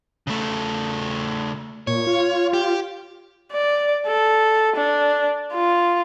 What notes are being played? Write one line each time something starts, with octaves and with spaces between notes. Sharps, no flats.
C#3 A3
A#2 C#5
F4
G4
D5
A4
D4
F4